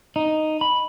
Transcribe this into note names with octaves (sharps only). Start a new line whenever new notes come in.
D#4
B5